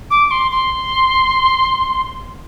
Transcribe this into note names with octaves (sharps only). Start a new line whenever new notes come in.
D6
C6
C6